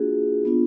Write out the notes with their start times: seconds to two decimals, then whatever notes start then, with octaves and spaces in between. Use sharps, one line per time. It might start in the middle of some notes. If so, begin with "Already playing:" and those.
Already playing: A#3 D4 F4 F#4 G#4
0.45 B3 D4 F4